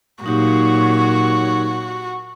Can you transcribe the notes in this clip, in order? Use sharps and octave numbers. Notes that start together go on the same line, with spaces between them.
A#2 F#3 D#4 F#4 G4 C#5